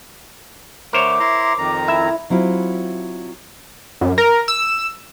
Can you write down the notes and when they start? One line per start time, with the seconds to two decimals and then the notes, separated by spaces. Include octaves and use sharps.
0.93 D3 A3 A#4 C5 C#5 D6
1.20 E4 A#5 C6
1.58 F2 D#3 A#5
1.88 E4 E5
2.30 F#3 C4 E4 F4
4.01 F#2
4.18 A#4
4.48 E6